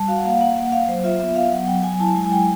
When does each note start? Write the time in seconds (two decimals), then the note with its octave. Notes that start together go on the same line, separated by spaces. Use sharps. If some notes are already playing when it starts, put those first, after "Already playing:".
Already playing: G3 A5
0.08 F#4 F5
0.17 F#5
0.25 A#3 F5
0.41 A#3 F#5
0.56 A#3 F#5
0.72 A#3 F5
0.88 F#3 C5
1.04 F4 E5
1.20 B3 E5
1.36 B3 F5
1.52 F#3 F#5
1.67 F#3 G5
1.83 F#3 G#5
2.00 E4 A5
2.15 G#3 G#5
2.26 G#5
2.31 G#3 G5